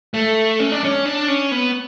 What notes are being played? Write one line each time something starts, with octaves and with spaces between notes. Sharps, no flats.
A3
C#4
D4
C#4
D4
C#4
B3